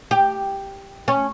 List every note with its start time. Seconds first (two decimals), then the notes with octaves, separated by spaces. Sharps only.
0.11 G4
1.08 C#4